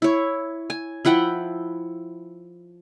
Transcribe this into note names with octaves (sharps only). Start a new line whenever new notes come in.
E4 C#5
G#5
F3 E4 F#5 G5